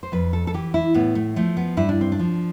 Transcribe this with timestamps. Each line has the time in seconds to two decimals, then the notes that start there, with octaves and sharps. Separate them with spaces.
0.03 C5
0.12 F2 B4
0.33 A4
0.47 A4
0.54 E3 G4
0.74 E4
0.94 A2 B3
1.15 A3
1.36 F3 A3
1.57 B3
1.77 G2 E4
1.89 D4
2.01 C4
2.12 D4
2.19 F3